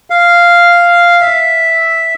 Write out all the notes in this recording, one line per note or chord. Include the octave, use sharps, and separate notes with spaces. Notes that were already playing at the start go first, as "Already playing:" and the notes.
F5
E5